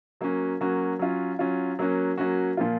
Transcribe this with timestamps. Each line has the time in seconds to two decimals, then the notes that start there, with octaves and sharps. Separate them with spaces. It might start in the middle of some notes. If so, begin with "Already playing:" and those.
0.21 F#3 A#3 C#4 F#4
0.61 F#3 A#3 C#4 F#4
0.99 F#3 C#4 F4
1.39 F#3 C#4 F4
1.79 F#3 A#3 C#4 F#4
2.18 F#3 A#3 C#4 F#4
2.57 A#2 F3 A#3 F4